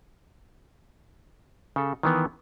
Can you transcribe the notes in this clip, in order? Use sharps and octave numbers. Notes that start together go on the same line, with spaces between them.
C#3 A4
D#3 E3 B3